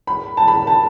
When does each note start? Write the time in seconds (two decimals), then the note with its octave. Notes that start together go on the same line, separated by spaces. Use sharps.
0.07 B5
0.37 A5
0.48 B5
0.67 A5